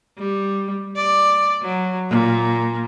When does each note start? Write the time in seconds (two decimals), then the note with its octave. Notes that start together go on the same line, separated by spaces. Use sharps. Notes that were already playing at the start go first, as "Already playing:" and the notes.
0.18 G3
0.96 D5
1.62 F#3
2.10 A#2